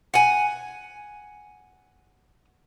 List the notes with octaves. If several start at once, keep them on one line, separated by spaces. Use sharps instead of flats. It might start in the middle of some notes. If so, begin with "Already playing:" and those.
F#5 G#5